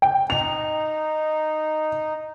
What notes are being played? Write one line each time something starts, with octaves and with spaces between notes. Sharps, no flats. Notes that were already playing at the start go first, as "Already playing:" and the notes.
G5
D#4 F7